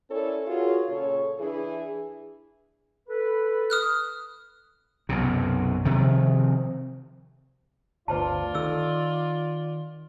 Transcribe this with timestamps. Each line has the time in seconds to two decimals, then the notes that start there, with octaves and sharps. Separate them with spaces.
0.10 C#4 E4 A4 A#4 C#5 D5
0.48 F4 F#4 G#4 A#4 C#5
0.89 A#2 C#3 A4 C#5
1.40 E3 D4 E4 G#4
3.07 A4 B4
3.70 D#6 F6 F#6
5.09 B1 F#2 C3
5.85 C3 D#3 F3
8.08 G1 D2 F4 B4 C5 D5 A5
8.55 D#3 A4 E6